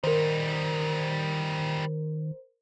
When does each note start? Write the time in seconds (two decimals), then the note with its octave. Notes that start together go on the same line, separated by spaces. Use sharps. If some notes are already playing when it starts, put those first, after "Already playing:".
0.04 D#3 G3 D#4 A#4 C5